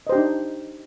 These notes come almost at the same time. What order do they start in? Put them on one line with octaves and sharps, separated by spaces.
D#5 C5 G4 D4 D#4